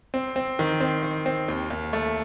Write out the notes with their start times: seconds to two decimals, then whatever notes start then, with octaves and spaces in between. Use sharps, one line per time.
0.14 C4
0.36 C4
0.59 D#3
0.81 C4
1.03 D#3
1.26 C4
1.48 D#2
1.70 D#2
1.93 A3